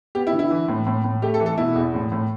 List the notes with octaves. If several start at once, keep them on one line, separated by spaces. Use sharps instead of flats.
B3 G4
E4
D3
E4
E3
A2
A2
A2
A3 G4
A4
E3
A4
B2 E4
E2
A2
A2